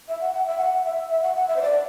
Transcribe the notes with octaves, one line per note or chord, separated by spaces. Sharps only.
E5
F#5
F#5
E5
F#5
E5
E5
F#5
F#5
E5
C5
D5